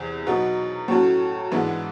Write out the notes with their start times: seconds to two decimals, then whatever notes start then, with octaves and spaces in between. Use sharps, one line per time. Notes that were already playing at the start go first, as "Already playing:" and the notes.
Already playing: E2 C3 E3
0.27 B2 F#3 B3 D#4
0.88 A2 F#3 A3 C#4 F#4
1.51 G#2 E3 G#3 B3 D4